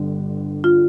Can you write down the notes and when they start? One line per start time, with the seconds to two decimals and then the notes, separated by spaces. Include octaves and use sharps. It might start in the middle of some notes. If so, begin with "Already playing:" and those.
Already playing: G1 G2 D3
0.64 F4